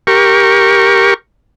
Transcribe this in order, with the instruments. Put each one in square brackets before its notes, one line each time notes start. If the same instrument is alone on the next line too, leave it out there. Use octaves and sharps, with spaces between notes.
[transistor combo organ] G4 A#4 C#6